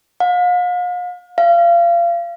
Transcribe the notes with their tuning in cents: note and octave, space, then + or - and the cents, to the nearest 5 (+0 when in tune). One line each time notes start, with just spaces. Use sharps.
F5 +40
F5 -30